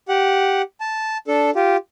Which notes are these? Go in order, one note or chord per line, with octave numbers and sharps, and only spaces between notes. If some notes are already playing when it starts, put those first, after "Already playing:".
G4 F#5
A5
D4 A4
F4 G4